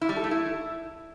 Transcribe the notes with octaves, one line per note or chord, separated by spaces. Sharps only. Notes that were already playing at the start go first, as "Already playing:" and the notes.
E4
G3
A4
A3
E4